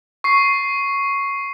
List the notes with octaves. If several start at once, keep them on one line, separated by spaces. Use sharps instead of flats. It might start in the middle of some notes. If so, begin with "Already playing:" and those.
C#6 C7